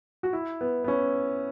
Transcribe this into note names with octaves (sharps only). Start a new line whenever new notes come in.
F#4
E4
B3
B3
C#4